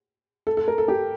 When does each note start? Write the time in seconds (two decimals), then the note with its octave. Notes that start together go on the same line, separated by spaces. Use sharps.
0.47 A4
0.57 A4
0.68 A#4
0.78 A4
0.88 G4